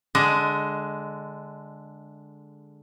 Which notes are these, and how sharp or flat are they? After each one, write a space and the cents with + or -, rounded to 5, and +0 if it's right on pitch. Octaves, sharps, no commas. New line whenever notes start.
D3 +0 G#3 +0 D#5 +20